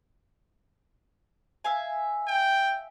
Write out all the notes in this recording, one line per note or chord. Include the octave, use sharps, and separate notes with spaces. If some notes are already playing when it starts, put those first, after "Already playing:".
E5 F5 G#5
G5